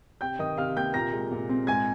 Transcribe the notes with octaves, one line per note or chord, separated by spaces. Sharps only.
C3 G5 G6
D#3 D#5 D#6
C3 F5 F6
A#3 G5 G6
A#2 A#5 A#6
G#3
A#2
C4
G#2 G#5 G#6